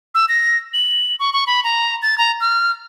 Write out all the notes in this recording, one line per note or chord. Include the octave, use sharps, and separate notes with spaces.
E6
A#6
F#7
C#6
C#6
B5
A#5
A6
A#5
F6